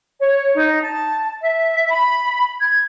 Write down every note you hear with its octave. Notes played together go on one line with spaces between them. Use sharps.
C#5
D#4
A5
E5
B5
G#6